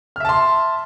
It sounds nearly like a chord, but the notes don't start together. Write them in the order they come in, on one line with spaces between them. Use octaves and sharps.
F6 E5 A5 C6